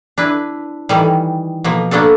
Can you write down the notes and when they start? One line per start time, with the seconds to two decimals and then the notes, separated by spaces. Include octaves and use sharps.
0.18 D4 E4 B4
0.89 D#3 E3 G3
1.64 B2 F3 A#3
1.91 A#3 B3 D4 F#4 A4